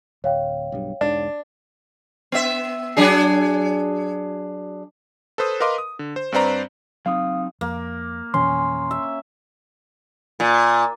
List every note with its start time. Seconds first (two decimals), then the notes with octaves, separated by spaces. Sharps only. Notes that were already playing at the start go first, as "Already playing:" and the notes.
0.24 D1 C#5 F5 G5
0.72 B1 G2
1.01 E1 G#2 D4
2.32 B3 E5
2.97 F#3 D4 G#4
5.38 A4 B4 C5 D#6
5.60 A#4 B4 D#5 F5 C6 D6
5.78 D#6
5.99 D3
6.16 C5
6.32 G2 C4 B4 C5 D5 A#5
7.06 F#3 C4 D#4 F5 D#6
7.61 F2 A#3
8.34 F2 B2 E3 C#4 C6
8.91 E5
10.40 A#2